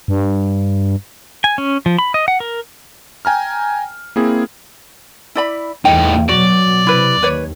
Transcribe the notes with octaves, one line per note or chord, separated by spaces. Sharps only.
G2
G#5
C#4
F3
B5
D#5
F#5
A#4
G5 G#5 A#5 F6
A#3 C4 E4 G#4
E4 D5 B5
E2 A2 D#4 G5
B2 F#3 F#4 D5
C3 E4 B4
D#2 B4 C#5